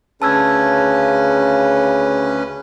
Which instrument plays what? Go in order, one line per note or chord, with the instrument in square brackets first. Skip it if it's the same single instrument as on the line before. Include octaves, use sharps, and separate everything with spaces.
[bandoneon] D2 C#4 B4 [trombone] C#3 [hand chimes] A5 E6 G#6